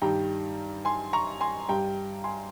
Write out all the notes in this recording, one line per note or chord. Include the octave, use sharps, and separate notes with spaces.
G2 D#3 G3 G5 A#5
G#5 C6
A#5 C#6
G#5 C6
G2 G3 G5 A#5
G#5 C6